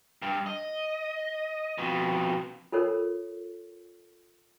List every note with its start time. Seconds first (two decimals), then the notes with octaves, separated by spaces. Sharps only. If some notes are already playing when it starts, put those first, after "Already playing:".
0.22 G2
0.46 D#5
1.78 F2 B2
2.72 F4 A4 A#4 C#5